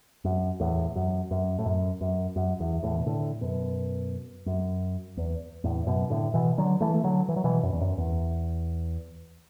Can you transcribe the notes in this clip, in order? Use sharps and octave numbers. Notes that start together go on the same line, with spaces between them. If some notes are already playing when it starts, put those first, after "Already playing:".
F#2
E2 A2
F#2
F#2
A2
F#2
F#2
F#2
E2
E2 A2
B2
A2 D3
F#2 B2
F#2
E2
E2 A2
F#2 B2
A2 D3
B2 E3
D3 F#3
E3 A3
A3
D3 F#3
E3
F#3
B2 E3
F#2
E2
F#2
E2